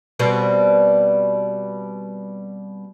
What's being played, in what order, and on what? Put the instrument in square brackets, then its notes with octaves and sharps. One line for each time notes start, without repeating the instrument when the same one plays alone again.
[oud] B2 G3 C4